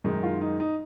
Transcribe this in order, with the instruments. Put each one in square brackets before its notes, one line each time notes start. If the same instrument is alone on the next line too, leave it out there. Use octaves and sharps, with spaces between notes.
[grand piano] F#2 D#3 G#3 D#4
F4
D#4
D#4